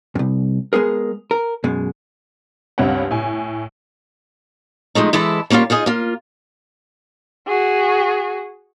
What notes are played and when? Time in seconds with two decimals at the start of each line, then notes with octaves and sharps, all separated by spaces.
0.15 C2 F#2
0.73 G#3 B3 G#4 A#4
1.31 A#4
1.64 F#2 B2 G#3
2.78 C#2 G2 C4 C#5 F#5
3.11 A2 G#5
4.95 F3 G#3 A3 D#4
5.13 E3 G#3 E4 A4 E5 A5
5.50 G3 A#3 C#4 D4 F4
5.70 D#4 F4 G#4 D#5
5.86 A#3 F4
7.47 F#4 G#4